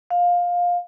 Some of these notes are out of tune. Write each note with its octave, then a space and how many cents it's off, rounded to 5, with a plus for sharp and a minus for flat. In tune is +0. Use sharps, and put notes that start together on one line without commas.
F5 +15